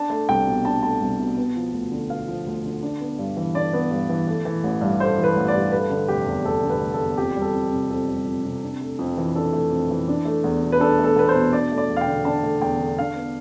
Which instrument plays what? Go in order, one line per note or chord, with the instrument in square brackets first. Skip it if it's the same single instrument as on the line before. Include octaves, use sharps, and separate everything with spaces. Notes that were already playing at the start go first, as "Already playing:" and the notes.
Already playing: [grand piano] D4 A5
A3
C2 G5
B2
D4 A5
A3 A5
C2
B2
B3
F3
D2
D3
B3 F5
F3
D2
D3
D4
B3
G2
E3
D4 D5
B3
G2
E3
A3
E3
A1
G2
A3 C5
E3
B4
A1
D5
G2
A3 B4
D3
F1 G4
E2
A3 A4
D3
B4
F1
A4
E2
F2 G4
G3
A4
F2
C3
F2 A4
G3
F2
C3
D4
A3
F2
E3
D4 A4
A3
F2
E3
D4
A3
E2
B2
B4
D4 A4
A3
A4
E2 B4
C5
B2
D4 D5
A3
D5
E2
F5
G5
D3
D4 A5
A3
E2 G5
D3
D4 F5
B3